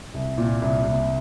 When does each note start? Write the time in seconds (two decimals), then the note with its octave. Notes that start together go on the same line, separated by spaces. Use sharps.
0.14 C2
0.38 A#2
0.62 C2
0.85 C2